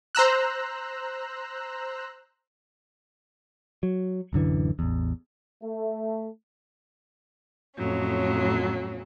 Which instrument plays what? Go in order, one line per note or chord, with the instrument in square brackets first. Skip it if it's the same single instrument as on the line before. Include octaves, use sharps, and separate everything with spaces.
[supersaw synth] C5 A#5 E6 F#6
[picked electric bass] F#3
D1 F#2 D3 E3
A1 E2
[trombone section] A3
[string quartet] F2 A2 F#3 C#4